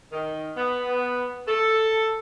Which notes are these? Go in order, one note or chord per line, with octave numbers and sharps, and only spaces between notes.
D#3
B3
A4